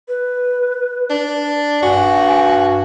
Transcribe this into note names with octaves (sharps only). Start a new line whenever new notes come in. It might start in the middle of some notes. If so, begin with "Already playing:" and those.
B4
D4
G2 F#4 G#5